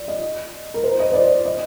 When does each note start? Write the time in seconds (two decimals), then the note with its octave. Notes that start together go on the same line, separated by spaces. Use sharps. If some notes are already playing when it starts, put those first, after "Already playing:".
Already playing: D5
0.08 D#5
0.74 A#4
0.84 C5
1.00 D#5
1.11 C5
1.14 D5
1.45 D#5